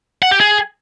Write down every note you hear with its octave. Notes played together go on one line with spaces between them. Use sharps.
F#5
G4
G#4